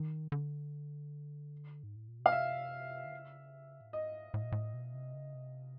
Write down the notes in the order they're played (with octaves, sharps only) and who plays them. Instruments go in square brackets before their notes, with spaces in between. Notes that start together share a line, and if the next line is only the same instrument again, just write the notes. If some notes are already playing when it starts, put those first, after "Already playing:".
Already playing: [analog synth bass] D#3
D3
G#2
A2
A#2
B2
[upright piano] F5
[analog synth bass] C3 [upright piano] E5
[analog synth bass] D3
C#3
A2
[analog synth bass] G#2 [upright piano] D#5
[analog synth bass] A2
A#2
A2
B2
C3
C#3
C3